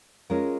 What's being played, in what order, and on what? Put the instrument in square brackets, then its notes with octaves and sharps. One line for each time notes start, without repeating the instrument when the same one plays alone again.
[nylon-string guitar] G#3 C#4 F4 A#4